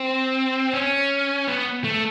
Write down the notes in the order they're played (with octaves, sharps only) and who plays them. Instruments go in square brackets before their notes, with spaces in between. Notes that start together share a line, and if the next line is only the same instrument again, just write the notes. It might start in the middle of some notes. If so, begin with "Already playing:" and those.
Already playing: [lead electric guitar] C4
C#4
B3
A3